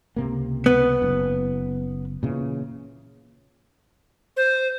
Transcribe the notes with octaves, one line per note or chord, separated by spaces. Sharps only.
C#2 C3 A#3
B3
F#1
A#2 C#3 E3
C5